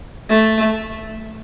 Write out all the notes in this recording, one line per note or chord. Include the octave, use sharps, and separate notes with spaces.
A3